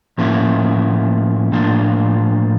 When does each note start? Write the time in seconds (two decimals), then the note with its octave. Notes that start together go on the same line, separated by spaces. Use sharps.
0.18 A2 F3 A#3 C#4 E4
1.52 A2 F3 A#3 D4 F4